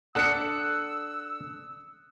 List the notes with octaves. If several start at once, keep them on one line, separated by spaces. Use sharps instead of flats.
D4 A4 F#5 D#6 E6 F#6 C#7